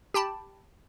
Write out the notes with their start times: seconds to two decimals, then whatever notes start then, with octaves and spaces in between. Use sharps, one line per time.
0.14 G4 G5 A5 B5